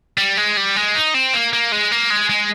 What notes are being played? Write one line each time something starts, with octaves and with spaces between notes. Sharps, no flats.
G3
G#3
G3
G#3
D#4
C4
A#3
A#3
G#3
A#3
G#3
G#3